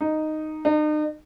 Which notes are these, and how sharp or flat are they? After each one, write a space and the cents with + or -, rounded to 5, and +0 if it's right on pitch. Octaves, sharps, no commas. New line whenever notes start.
D#4 -5
D#4 -40